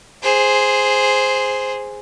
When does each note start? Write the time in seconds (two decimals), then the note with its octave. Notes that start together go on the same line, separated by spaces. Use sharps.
0.22 G#4 C5